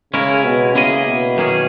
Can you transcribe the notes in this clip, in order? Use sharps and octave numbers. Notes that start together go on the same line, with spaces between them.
C#3 G#3 C#4 E4 A#4
B2
C#3 A#3 E4 G#4 D#5
B2
F#2 D#3 A#3 C#4 G#4